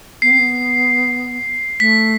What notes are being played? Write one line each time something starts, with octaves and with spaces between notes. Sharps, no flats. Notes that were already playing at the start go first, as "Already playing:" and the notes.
B3 C7
C4
B3
A3 B6